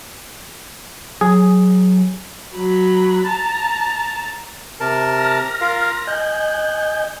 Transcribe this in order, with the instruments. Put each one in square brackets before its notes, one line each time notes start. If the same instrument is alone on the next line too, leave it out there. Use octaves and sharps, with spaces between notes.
[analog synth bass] F#3 [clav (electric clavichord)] G#4
[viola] F#3 B5
A5 A#5
[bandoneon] C3 A#4 A5
[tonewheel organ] F6 A#6
[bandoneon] F4 A#4 F5
[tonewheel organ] D#5 G#5 G6 [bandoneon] F#6